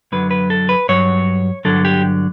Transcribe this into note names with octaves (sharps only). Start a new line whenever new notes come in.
F#2 D3 F#3 B4
B4
A4
B4
G2 F#3 C#5
G2 D3 F#3 A4
G4